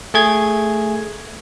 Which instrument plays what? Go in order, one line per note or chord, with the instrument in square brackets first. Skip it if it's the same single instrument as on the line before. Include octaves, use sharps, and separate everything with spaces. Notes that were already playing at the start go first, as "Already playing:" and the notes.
[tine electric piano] A3 G#4 G#6